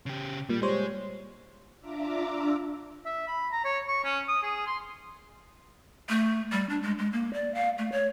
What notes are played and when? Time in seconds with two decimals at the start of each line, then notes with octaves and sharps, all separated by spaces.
0.06 C#3 G4
0.49 A#2 G3
0.62 G3 G#3 C5 C#5
1.80 D4 F4 E5 A#5 D6
3.06 E5
3.27 B5
3.52 A#5
3.65 C#5
3.88 C#6
4.04 C#4
4.28 D#6
4.43 G#4
4.67 C6
6.09 A3
6.52 G3
6.69 D4
6.82 G#3
6.98 G#3
7.13 A#3
7.33 D5
7.54 F5
7.78 A3
7.92 C#5